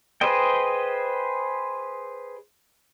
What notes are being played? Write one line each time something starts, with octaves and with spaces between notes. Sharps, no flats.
G#4 B4 C5 D#5 G5